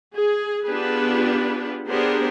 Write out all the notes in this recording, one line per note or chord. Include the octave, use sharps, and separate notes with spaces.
G#4
B3 D4 F4 G4 G#4 B4
B3 D4 G4 G#4 A#4 C5